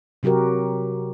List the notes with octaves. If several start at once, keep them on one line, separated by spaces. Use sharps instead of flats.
C3 F#3 F#4 G4 A#4